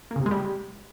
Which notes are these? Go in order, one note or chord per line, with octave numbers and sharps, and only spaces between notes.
A#3
C#3
C3
G#3
G3